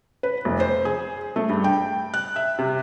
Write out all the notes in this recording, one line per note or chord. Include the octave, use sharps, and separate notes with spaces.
B4
F1
C5
G#4
A3
G2
G5
F#6
E5
C3